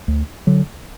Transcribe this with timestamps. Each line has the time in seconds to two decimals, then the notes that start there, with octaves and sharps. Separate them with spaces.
0.08 D2
0.47 D3 F#3